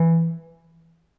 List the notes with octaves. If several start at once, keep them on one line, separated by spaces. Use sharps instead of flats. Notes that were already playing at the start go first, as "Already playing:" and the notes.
Already playing: E3